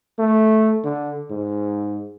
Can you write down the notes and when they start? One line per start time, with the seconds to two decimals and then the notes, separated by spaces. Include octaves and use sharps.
0.19 A3
0.84 D3
1.31 G#2